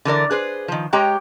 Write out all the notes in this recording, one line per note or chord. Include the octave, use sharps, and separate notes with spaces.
D3 E3 A#4 D5
G#4 B4 C5
D#3 F3
G#3 G4 C#5 G5 A#5